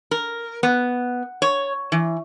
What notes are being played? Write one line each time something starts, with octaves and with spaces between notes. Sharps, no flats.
A#4
B3
C#5
E3